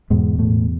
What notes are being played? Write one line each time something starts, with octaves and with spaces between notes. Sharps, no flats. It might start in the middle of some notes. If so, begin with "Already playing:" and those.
E2 G#2 B2 G#3
A2 A3